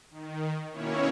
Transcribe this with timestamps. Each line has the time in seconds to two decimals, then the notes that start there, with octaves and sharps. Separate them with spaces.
0.11 D#3
0.71 B2 D#3 A#3 C#4 E4 C#5